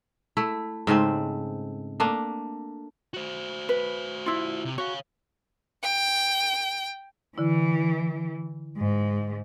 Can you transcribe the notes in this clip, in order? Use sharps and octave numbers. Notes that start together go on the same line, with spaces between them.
A3 E4
G#2 C#3 A3 C4
A3 A#3 D4
F#4 C5
B4
E4 F4
C3
F#4 C#5 F5
G5
D3 E3 E4
G#2